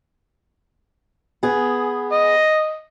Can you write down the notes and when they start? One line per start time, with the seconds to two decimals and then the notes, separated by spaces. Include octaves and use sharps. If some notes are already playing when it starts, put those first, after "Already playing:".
1.43 B3 G#4
2.12 D#5